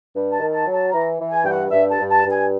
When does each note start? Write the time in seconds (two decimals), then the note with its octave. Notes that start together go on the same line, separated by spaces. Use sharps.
0.14 G2
0.33 A5
0.40 D#3
0.53 A5
0.66 F#3
0.73 A5
0.92 E3 A#5
1.19 E3
1.32 G#5
1.45 G2 G5
1.51 F#5
1.71 G2 E5
1.91 A5
1.98 G2
2.11 A5
2.25 G2
2.31 G#5